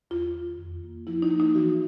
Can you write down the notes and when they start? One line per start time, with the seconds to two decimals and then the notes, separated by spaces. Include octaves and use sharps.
0.10 E2 F4
0.34 D#3
0.58 F2
0.83 A#3
1.07 F3 E4
1.22 D#4
1.32 A#3
1.40 D#4
1.55 E3 F#4